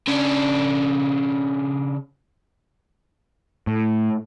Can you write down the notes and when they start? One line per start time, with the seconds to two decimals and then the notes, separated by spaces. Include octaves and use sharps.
0.07 C#3 D4
3.67 A2